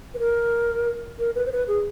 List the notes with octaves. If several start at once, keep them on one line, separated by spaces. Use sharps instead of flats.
B4
A#4
A#4
B4
C5
B4
G#4